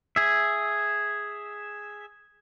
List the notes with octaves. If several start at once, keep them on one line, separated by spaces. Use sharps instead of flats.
G#4 E5